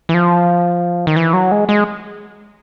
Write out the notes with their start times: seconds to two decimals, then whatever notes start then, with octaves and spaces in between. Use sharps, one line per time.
0.09 E3
0.14 F3
1.07 D#3
1.16 E3
1.33 F#3
1.52 G#3
1.69 G#3